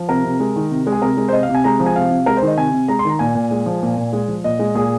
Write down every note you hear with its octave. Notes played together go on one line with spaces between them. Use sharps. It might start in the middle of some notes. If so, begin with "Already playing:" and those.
Already playing: F3
C3 A#4
C3
G#3
D#3
C3
G#3
G#4
C3 A#4
G#3
C5
C3 D#5
F5
C3
G#5
G#3 A#5
F3
G#5
C3 F5
C3
G#3 A#4
C5
D#3
D#5
C3 G#5
C3
G#3 A#5
C6
D#3 A#5
A#2 G#5
A#2
G#3
F3
A#2
A#2
G#3
F3
A#2 D#5
G#3
A#2 G#4